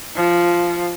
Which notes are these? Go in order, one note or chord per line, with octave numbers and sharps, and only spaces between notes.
F3